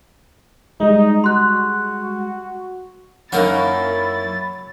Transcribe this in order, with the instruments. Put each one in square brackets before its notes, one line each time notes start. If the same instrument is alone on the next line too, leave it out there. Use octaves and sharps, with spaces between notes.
[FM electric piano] G3 G#3 [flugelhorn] D#4
[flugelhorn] F#4 [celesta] C6 F#6
[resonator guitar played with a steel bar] F#2 A#3 D#4 [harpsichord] F#3 F#4 A#4 [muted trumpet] E4 [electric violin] A6